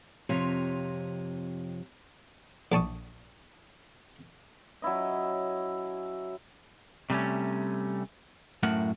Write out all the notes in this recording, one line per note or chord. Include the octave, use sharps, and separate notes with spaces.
F2 C3 F3 C#5 D#5 A#5
A#1 D4 A5 C#6 D#6
F#3 C#4 E4 D#5
C3 G3 A3 C#4
F#2 A2 A3 A#4 F#5